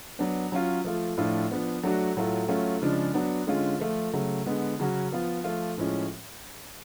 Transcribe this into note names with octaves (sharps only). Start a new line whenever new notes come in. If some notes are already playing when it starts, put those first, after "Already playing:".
F#3 B3 D4
F#3 C#4 F4
F3 A3 F4
A2 F3 A3 D4 F4
F3 B3 D4
F#3 A3 D4 F#4
A2 F#3 A3 F4
F#3 A3 C#4 F4
C#3 F3 G#3 D4
F#3 B3 D4 F#4
D3 G#3 C#4 F4
F3 A3 F4
C#3 F#3 A3
D3 G#3 B3
C#3 F#3 C#4 F#4
F3 B3 F4
F3 A3 F4
A2 F3 G#3 C#4